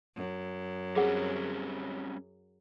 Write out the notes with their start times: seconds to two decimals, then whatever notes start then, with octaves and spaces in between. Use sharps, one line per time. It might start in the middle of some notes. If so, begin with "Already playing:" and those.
0.16 F#2
0.96 G3 C4 C#4 G#4 F#5